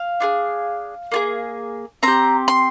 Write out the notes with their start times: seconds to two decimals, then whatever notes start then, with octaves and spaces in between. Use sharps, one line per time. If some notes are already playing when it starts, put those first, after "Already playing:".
Already playing: F5
0.20 D4 F4 G#4
1.12 A#3 F4 G#4
2.03 C4 G4 A#5
2.48 C6